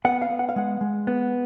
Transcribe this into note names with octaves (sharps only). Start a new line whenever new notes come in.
B3 F#5
F5
B3
F#5
F5
G#3 F#5
G#3
B3